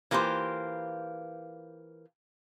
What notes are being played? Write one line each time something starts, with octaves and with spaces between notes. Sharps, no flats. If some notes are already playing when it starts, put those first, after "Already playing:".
E3 A#3 F4 G4 C5